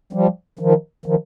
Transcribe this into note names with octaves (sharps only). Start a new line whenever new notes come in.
F3 G3
D#3 F3
D#3 F3